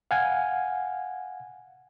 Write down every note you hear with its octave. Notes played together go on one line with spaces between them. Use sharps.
F5 F#5 G#5